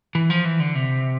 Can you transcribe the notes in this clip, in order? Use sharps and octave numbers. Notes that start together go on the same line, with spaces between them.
E3
F3
E3
D3
C3